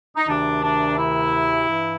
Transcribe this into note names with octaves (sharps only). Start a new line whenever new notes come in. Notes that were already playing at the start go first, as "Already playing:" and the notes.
D#4
D2 C3 D#3 D4
D4
E4
G2 E3